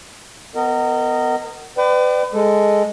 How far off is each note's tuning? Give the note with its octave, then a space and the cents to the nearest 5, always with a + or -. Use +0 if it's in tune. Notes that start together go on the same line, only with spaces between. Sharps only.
B3 +20 A#4 -30 D#5 -5
B4 +40 D5 +30 G5 -25
G#3 +0 A4 +0